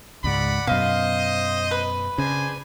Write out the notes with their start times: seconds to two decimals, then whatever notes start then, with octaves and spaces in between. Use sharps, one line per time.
0.24 C#2 G#2 D5 F#5 B5
0.67 F#2 B2 C5 D#5 F5
1.71 B4
2.18 C#3 D4 C5 G#5